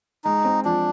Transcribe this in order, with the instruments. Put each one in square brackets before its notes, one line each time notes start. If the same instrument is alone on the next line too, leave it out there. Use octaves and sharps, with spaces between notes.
[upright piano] G#3 [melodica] D#4
[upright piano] C4
[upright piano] F3 [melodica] D4